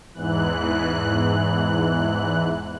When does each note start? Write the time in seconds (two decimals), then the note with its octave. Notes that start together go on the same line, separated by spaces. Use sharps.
0.14 E2 G#2 E3 F#6